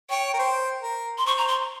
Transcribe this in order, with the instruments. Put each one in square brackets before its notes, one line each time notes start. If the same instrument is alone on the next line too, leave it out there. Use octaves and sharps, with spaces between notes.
[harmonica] C#5 [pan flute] G5
[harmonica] A#4
C5
A#4
[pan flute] C6
[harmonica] C5 [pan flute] C#6
[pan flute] A#5
C6